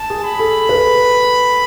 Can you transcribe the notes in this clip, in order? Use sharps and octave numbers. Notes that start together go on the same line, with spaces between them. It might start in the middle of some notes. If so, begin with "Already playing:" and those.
Already playing: A5
G#4
B5
A4
B4